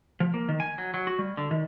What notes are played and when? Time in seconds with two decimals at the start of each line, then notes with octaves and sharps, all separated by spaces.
0.20 F3
0.34 A#3
0.49 D#3
0.60 G#5
0.78 F#3
0.94 F#3
1.07 F#4
1.19 G3
1.37 D3
1.51 D#3